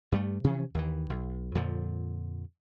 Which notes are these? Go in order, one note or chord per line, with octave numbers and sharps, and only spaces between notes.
G2 G3 A3
C3 E3 F3 C#4
D#2 D#3 E3
B1
F2 A#2 D3 F3